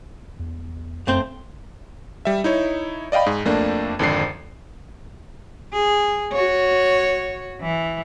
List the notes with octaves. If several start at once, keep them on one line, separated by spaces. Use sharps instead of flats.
E2
F#2 A3 C4 C5
G3 E5
D#4 E4 C#5
D5 D#5 F5 G5 B5
G#2 G#4
F2 A3 A#3 D4
G#1 F2 D3 D4 C7
G#4
F#4 C#5
E3